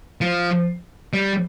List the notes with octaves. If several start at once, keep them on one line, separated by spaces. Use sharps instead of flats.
F3
G3